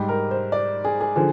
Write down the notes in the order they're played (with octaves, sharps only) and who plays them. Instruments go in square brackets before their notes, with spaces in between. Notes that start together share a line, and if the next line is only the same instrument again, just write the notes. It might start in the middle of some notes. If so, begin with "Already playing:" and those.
Already playing: [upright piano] G#2 G3 G4
A#4
C5
D5
G#4
G#4
D3 F3 G#4